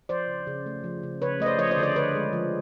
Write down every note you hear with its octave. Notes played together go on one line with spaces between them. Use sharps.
F3 C5 D5
C#3
C#3
A3
F3
C#3
C#3 B4 C#5
A3 D#5
C5 D5
F3 C#5 D#5
C5 D5
D3
C5 D5
D3 B4 C#5
G#3
F3